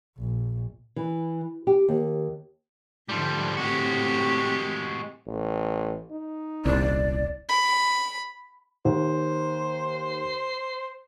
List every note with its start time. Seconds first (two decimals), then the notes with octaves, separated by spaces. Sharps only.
0.19 A#1
0.96 E3
1.67 G4
1.89 D#2
3.09 G#2 D3 F3 G3
3.57 A2 G#3 C4 F#4 G4
5.27 A1
6.12 D#4
6.65 D#1 C2 D5
7.49 B5
8.85 D#2 C5